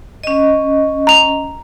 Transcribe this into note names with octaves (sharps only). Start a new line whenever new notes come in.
C#4 D#5
A#5 F7